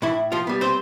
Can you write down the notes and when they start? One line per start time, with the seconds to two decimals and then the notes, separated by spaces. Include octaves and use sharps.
0.02 A2 E3 E4
0.32 F3 F4
0.47 G3 B3
0.61 C4 C5